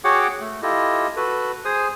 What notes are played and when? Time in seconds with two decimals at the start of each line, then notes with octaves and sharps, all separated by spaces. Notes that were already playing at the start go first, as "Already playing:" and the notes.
0.04 F#4 G#4 C#5 F#5 G5 D6
0.40 A3
0.62 E4 F4 G4 A4 D#5
1.16 F#4 A4 B4
1.65 G#4 C5 G#5 D#6